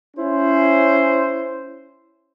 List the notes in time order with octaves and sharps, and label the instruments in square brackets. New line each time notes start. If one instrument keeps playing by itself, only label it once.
[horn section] C#4 E4 C5